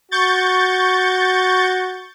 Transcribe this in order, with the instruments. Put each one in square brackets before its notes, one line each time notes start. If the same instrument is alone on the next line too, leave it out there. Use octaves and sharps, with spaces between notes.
[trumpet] F#4 [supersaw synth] C#6 G6 A6